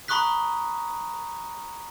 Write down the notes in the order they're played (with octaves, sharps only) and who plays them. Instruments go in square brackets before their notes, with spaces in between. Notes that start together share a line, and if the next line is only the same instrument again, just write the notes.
[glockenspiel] A#5 B5 C#6 D#6 F#6 B6